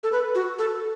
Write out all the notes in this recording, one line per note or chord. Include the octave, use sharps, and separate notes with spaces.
A4
B4
F#4
A4